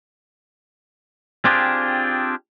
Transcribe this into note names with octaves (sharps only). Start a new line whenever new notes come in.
C4 D4 F4 G4 G#4